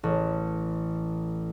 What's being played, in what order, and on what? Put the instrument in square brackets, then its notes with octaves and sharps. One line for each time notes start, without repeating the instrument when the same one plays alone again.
[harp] A1